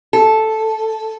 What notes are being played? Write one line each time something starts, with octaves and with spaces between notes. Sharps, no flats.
A4